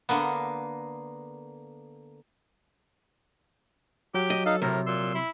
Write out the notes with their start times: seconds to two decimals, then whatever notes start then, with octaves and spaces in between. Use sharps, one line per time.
0.09 D3 A#3 B3
4.14 F#3 G4
4.30 D#5
4.46 D#4 A4 F5
4.62 A2 C3 A#4
4.87 A#2 C6 E6
5.15 E4